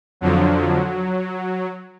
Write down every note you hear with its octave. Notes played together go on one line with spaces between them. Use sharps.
F2 D3 F3 F#3